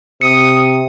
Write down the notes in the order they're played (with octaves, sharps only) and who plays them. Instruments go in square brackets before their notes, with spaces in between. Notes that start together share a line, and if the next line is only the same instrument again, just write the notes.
[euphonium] C3 [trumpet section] D#6 [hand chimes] C#7